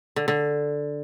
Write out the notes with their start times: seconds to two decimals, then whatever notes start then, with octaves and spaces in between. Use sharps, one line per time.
0.16 D3
0.28 D3